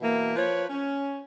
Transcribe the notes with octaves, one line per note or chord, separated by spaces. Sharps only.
B2 E3 A#3
F3 B4 C#5
C#4